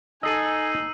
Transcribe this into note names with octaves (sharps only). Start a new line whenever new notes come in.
D#4 A4 D#5 G#5 E6 C7 D#7